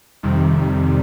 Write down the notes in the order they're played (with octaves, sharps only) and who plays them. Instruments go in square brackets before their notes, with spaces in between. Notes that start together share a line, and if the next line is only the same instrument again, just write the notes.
[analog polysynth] F2 C3 D#3 G3